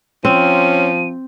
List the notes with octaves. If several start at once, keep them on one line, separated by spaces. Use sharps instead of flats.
F3 C4 C#4 D#7